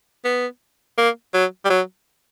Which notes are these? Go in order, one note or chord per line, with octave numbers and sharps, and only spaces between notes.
B3
A#3
F#3
G3
F#3